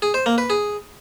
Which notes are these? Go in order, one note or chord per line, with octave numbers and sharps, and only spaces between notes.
G#4
C5
A#3
B4
G#4